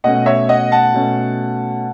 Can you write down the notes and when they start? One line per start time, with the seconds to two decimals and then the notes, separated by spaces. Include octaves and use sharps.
0.04 B2 A3 C#4 D#5 F#5
0.26 C#5 E5
0.49 D#5 F#5
0.72 F#5 A5
0.94 B2 A3 C#4